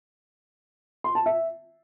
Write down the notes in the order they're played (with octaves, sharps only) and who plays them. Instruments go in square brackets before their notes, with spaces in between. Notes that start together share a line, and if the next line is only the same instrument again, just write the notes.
[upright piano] C6
A5
E5